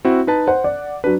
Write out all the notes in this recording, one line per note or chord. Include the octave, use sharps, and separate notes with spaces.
C4 E4 F#4
D#4 B4 A5
C5 F#5
D5
F#3 D4 B4